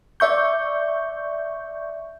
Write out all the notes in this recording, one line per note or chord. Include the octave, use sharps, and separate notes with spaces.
D5 E5 C#6 G6